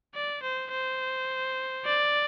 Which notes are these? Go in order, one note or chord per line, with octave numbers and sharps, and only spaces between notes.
D5
C5
C5
D5